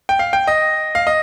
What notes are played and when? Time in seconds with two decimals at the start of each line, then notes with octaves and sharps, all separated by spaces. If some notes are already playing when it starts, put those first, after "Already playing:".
0.09 G5
0.19 F5
0.33 G5
0.47 D#5
0.95 F5
1.07 D#5